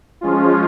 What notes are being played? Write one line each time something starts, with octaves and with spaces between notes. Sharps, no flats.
F3 G#3 C#4 F4